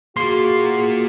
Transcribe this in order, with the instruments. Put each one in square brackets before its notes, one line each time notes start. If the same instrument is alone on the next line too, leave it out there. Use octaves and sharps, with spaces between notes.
[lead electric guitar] A#3 F4 [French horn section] F#4 [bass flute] G#4 [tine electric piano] C6